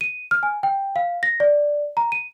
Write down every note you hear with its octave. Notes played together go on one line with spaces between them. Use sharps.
D#7
F6
G#5
G5
F5
A#6
D5
A#5
D#7